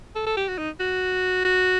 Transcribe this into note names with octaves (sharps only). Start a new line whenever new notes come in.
A4
A4
G4
F#4
D#4
F#4
F#4